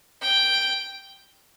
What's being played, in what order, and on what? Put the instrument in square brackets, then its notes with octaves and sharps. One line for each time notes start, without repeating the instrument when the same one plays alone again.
[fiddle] G5